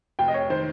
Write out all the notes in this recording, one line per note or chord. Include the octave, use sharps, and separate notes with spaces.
F1 G5
D#5
C#5
D#3 C5